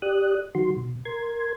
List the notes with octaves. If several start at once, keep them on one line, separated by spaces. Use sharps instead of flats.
G4 D5 D#6 F#6
D#3 F#3 F#4 C6
B2
A#4 C6 G#6